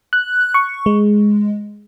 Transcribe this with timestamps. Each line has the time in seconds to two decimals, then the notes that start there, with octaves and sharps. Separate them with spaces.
0.13 F#6
0.54 C#6
0.86 G#3